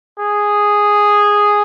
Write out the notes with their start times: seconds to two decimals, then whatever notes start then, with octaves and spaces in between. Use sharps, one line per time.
0.19 G#4